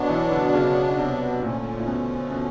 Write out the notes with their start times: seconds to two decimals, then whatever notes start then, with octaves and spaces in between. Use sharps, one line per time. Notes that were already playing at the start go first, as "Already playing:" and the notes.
Already playing: B2 F#3 B3 D4
0.09 E3
0.31 D3
0.53 C#3
0.98 C3
1.43 A#2 D3 F3 A3 C#4
1.80 A#2
1.87 B2
2.31 B2